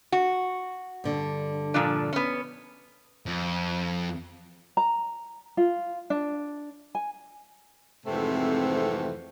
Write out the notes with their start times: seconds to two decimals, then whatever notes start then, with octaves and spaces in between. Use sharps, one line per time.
0.12 F#4
1.04 G2 D3
1.74 A#2 F3 D4
2.13 B3 C#4
3.26 F2
4.77 A#5
5.57 F4
6.10 D4
6.95 G#5
8.06 F2 G#2 C3 E3 A3 C4